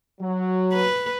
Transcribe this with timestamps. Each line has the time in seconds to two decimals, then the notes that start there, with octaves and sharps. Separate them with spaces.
0.21 F#3
0.73 B4